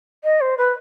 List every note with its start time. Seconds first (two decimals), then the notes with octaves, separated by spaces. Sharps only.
0.24 D#5
0.41 C5
0.58 B4